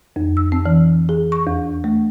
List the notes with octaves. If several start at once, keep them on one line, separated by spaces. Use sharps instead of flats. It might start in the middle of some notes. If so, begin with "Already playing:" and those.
F2
E6
C4
E3
G#4
C#6
E2
A3